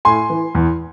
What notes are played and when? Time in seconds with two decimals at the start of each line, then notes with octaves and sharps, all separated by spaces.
0.05 A2 G#5 C6
0.30 E3
0.55 E2